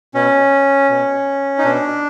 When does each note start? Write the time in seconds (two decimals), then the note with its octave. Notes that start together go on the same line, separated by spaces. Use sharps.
0.14 B2 C#4
0.90 B2
1.58 D#4
1.64 B2 D4